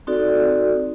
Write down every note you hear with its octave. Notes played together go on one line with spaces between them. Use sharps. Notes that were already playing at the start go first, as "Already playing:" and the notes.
C4 D#4 F#4 A4 D5